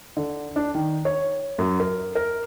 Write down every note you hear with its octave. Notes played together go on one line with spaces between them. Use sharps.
D3
D4
D#3
C#5
F#2
A#4
A#4